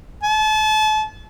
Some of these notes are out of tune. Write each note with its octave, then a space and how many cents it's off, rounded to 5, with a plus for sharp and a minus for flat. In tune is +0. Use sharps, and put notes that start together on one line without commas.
A5 -35